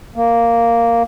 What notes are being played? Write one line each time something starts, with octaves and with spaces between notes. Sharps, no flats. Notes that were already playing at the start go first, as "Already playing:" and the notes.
A#3